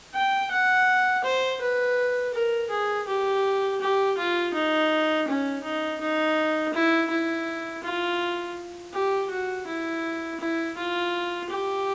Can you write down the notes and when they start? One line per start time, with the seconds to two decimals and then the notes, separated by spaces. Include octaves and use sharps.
0.14 G5
0.51 F#5
1.24 C5
1.61 B4
2.34 A#4
2.70 G#4
3.07 G4
3.81 G4
4.18 F4
4.54 D#4
5.28 C#4
5.64 D#4
6.01 D#4
6.74 E4
7.10 E4
7.83 F4
8.93 G4
9.30 F#4
9.67 E4
10.40 E4
10.77 F4
11.50 G4